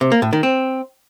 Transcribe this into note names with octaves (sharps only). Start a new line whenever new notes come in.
C3
A#3
A2
D#3
C4